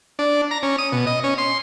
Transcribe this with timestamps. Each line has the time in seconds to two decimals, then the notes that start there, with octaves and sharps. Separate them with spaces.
0.19 D4
0.51 A#5
0.63 C#4
0.78 D#6
0.92 B2
1.07 D#5
1.24 C#4
1.38 C6